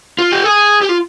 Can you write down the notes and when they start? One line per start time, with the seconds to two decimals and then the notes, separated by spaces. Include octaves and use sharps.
0.19 F4
0.32 G4
0.44 G#4
0.81 G4
0.89 F4